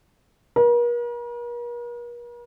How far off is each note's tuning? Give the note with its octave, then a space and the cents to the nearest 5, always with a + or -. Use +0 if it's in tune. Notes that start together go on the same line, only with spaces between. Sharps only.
A#4 +45